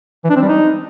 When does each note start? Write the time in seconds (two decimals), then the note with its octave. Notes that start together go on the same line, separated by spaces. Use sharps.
0.24 E3
0.30 D4
0.36 C4
0.42 G3
0.48 D#4